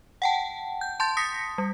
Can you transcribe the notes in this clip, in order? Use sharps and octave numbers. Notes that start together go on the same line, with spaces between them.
F#5 G5 A5
G6
A5 C6 G6 A6
D#6 A#6 B6 C#7
G3